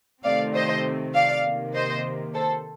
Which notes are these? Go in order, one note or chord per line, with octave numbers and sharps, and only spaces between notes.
C3 D#3 A3 C4 D5 F5
C5 D#5
D5 F5
C3 D#3 A#3
C5 D#5
A4 C5